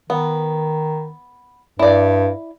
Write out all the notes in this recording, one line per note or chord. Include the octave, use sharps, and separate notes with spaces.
D#3 B3
G2 E4 D5